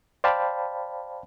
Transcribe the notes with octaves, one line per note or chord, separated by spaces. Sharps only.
C5 D5 F5 G5 A5 B5